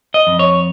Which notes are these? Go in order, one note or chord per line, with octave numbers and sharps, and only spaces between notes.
D#5
F2
C#5